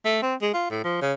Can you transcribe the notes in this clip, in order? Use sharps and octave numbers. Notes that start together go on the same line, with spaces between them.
A3
C4
G#3
F4
A2
F3
C#3